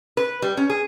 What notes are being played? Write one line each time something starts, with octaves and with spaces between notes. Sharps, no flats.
B4
G3
C#4
G#4